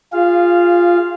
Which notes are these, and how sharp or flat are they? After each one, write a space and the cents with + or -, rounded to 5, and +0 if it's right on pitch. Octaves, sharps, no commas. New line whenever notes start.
F4 +0 G#4 -30 F5 -15